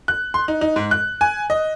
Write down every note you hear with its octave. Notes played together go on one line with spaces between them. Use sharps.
F#6
C6
D#4
D#4
G#2
F#6
G#5
D#5